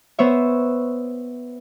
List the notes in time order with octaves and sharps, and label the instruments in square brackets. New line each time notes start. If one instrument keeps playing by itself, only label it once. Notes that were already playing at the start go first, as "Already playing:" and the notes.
[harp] B3 C5 C#5 E5